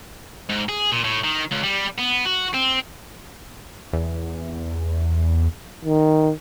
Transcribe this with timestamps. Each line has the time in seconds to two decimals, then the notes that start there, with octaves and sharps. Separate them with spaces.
0.50 G#2
0.69 G#4
0.92 A#2
1.04 A2
1.24 D#3
1.51 C#2
1.63 G3
1.98 B3
2.25 F#4
2.54 C4
3.93 E2
5.85 D#3